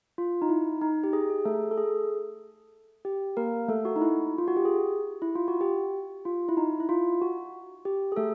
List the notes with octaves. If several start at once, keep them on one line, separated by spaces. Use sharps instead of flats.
F4
D#4
E4
D#4
G4
G#4
G#4
A3 A4
A4
G#4
G4
A#3 A#4
A3 A4
F#4
D#4
E4
F4
F#4
G4
G#4
E4
F4
F#4
G4
F4
E4
D#4
E4
F4
F#4
G4
G#4
A3 A4